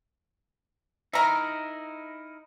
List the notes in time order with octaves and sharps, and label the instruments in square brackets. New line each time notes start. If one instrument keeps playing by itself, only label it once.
[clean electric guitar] D#4 E4 A#4 [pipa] E5 A#5